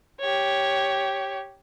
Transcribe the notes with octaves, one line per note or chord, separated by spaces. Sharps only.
G4 C#5